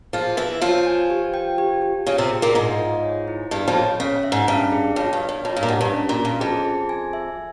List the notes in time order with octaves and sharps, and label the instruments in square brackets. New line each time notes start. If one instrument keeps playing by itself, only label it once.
[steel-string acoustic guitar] F3 F4 [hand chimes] G#4
[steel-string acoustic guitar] E3 E4 [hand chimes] E5
[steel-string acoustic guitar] F3 F4 [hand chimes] C#5
[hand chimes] G#5
G4
G5
G4
G4
[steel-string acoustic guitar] C#3 C#4 [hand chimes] F4
[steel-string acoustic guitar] C3 C4
[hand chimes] G#4
[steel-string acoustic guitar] A#2 A#3
[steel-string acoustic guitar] G#2 G#3 [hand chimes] F5
[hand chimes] F4
C#5
E4
[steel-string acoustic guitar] G2 G3 [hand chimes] G#4
[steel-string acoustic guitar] F2 F3
[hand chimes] C#5
[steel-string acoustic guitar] C#3 [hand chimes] C#4
[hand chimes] E5
[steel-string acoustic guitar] G#2
[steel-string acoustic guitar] G2 [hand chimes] C#4
[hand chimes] G#4
[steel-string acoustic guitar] F2 [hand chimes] C#5
[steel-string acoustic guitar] G2
[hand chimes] C#5
[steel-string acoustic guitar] G2
[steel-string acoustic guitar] F2 [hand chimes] C#5
[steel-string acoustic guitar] G2
A#2
[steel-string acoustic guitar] G#2 [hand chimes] G4
[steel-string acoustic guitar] G2
[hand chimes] C#4
[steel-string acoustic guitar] A#2
[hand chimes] C#4
[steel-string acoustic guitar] G2
[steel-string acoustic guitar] F2 [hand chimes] G#4
[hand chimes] G#4
G#5
E5